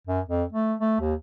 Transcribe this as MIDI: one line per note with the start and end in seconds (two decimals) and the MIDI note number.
0.07 0.20 42
0.29 0.44 41
0.52 0.74 57
0.80 0.96 57
1.00 1.14 39